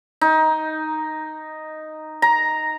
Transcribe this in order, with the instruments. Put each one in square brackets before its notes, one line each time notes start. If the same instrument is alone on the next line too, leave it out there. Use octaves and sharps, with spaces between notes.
[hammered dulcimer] D#4
A#5